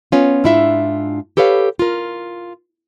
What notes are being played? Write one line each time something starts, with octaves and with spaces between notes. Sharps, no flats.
B3 C#4 F4
G#2 D4 E4 F4 E5
G4 A4 B4 C#5 F5
F4 A#4